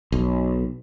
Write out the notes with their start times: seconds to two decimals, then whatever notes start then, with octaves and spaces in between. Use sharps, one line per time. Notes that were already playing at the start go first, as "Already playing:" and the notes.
0.12 B1